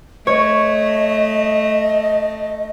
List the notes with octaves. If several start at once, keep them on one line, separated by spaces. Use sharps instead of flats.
A3 C#5 D#5